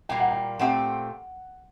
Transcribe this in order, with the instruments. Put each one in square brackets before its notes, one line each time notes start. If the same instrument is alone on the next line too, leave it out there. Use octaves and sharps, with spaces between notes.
[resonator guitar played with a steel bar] A#2 G3 A#3 [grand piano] G5
[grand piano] F#5
G5
[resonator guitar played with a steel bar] A#2 A3 C4 G4 [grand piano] F#5